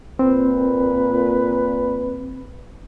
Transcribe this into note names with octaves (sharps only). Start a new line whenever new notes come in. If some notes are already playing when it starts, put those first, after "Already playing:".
A#2 C4 B4